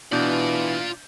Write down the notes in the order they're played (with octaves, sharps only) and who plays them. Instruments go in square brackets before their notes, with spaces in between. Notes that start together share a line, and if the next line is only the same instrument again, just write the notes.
[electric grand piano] B2 D4 G6 [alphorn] E3 [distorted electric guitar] F4 D5